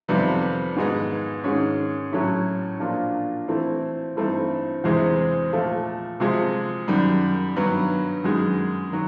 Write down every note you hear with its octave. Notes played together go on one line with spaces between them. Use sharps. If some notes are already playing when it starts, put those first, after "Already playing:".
F2 C3 D#3 G3 B3
G#2 D#3 G#3 B3 D#4
G#2 D#3 G#3 C#4
A2 F#3 A3 C#4 E4
A#2 F3 A#3 D4 F4
E3 A3 C4 E4
G2 E3 A3 C4 D#4
E2 C3 E3 G#3 C4
A#2 F3 A3
C3 F3 G#3
F#2 D#3 G3
G2 D#3 F#3 B3
F#2 D#3 G#3
D#3 F#3